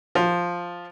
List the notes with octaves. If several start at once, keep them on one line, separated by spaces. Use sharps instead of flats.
F3